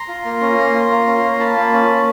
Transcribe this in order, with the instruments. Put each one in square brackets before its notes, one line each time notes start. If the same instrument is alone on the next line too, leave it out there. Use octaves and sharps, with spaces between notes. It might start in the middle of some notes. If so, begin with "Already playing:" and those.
Already playing: [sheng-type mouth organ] A#5 C6
F4
A#3
C#4
A#3
F4
A#3
C#4
A#3
F4 A5 B5
A#3
C#4
A#3